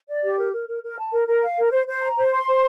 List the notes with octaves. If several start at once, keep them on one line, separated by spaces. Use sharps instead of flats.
D5
G4
A#4
A#4
A#4
A#4
A5
A#4
A#4
F5
A#4
C5
C5
A#5
C5
C6
C5